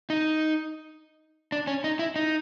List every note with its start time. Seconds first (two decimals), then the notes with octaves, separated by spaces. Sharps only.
0.10 D#4
1.52 D4
1.67 C#4
1.84 D#4
1.99 E4
2.16 D#4